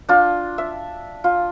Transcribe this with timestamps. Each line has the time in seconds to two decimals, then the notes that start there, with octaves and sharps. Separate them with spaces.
0.09 D4 F4
0.58 E5
1.24 F4